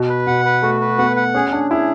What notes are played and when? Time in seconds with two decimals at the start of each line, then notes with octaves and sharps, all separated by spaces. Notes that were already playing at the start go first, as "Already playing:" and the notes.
Already playing: B2
0.09 B4
0.27 B2 F#5
0.45 B4
0.62 A3 F#4
0.81 B4
0.98 B3 F#5
1.16 F#5
1.34 C#4 G#4
1.53 D4 G#4
1.71 E4 G#4